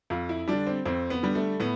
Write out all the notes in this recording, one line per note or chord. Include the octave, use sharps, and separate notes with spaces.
F2 F4
E4
D3 G3 D4
C4
F2 C4
B3
D3 G3
A3
A2 B3